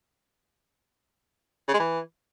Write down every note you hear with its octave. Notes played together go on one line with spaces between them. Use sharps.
C#3
G#3
E3